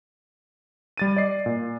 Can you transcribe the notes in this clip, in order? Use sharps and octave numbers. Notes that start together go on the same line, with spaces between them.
G3 A6 D#7
D5 D#5 C7
A#2